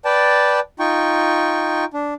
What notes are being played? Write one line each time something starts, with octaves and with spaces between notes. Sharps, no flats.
B4 D5 G5 A5
D#4 F4 G5 C#6
D4